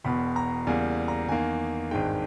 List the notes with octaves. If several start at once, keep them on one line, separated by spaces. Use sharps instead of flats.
E1 E2 B2 B5
A#5
E2 C#3 G3 A#3 G#5
A#5
E2 D#3 A#3 G#5
G#1 G2 D#3 G#3 G5